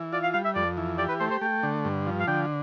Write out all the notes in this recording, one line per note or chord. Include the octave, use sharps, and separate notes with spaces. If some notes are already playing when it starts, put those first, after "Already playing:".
Already playing: E3
F4 D5
F5
G3 F5
E5
F2 D5
E3
G4 D5
B4
A3 C5
C5
A3 G5
D3
G2
F3
F5
D3 G5